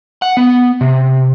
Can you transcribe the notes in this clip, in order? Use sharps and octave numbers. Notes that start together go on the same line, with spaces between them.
F#5
B3
C3